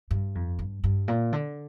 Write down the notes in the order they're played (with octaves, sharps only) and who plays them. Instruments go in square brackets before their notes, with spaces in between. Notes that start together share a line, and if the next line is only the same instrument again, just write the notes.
[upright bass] G2
F2
G2
G2
A#2
D3